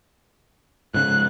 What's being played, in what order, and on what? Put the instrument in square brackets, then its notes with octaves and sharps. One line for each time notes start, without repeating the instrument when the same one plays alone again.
[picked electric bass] G#2 C#3 [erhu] F#6